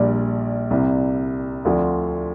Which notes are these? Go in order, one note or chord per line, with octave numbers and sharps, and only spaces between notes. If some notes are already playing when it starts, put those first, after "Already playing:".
Already playing: A#1 A#2 G3 D4
C2 C3 G3
D2 D3 F3 C4